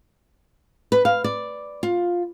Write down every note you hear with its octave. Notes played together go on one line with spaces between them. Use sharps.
B4
F5
D5
F4